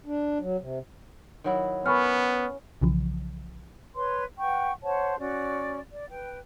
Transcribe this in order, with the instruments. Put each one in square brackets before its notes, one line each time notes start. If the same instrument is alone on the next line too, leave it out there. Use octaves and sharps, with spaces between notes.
[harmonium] D4
F#3
C3
[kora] D#3 F#3 E4
[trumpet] B3 [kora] C#4 A#4 [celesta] B5 C#6 F6
[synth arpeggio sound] B1 C#3 E3 F3
[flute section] B4 C#5 C6
B4 F#5 G5 C#6
C5 C#5 F#5 A5
C#4 F#4 D5
D5
B4 G5